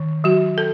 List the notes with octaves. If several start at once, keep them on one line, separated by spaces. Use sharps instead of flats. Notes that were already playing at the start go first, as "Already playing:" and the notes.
Already playing: D#3
F#3 F#4
A4